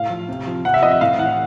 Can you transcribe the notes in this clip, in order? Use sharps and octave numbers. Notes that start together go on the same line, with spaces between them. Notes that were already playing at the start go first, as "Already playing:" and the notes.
Already playing: A2 F5
F3
C3
F3
C3 F#5
E5
F3 D#5
E5
A2 F5
E3 F#5